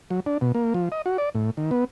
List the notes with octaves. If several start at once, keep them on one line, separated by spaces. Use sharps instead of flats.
F#3
D4
B2
A#3
F3
D#5
F#4
D5
A2
D#3
B3